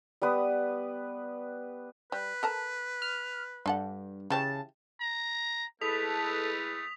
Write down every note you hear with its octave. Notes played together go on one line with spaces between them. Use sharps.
G3 B3 B4 D#6
G3 B4
A4 A#4 A5
F6
G2 D4 A4 F#5
C#3 E3 G4 C#5 A5
A#5
G#3 A3 E4 A4 B4 D#6 B6 F7